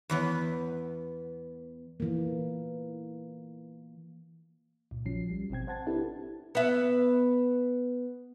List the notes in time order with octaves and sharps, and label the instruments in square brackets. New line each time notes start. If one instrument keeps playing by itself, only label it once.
[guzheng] E2 E3 B3
[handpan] E3 A#3
[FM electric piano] C#2 A#2
A#1 F3 F#3 C#4 C7
G3
G#1 B2 C4 G5 G#6
C5 F#5 A5 G#6 A6
C4 D4 E4 G4 A4 B4
[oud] B3 E5